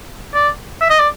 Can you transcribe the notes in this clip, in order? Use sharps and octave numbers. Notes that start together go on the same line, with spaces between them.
D5
E5
D#5
D5